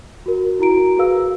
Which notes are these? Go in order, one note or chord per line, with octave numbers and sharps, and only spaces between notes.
F#4 A#4
E4 F#4 A#5 D7
F#4 G#4 A#4 B4 F5 E6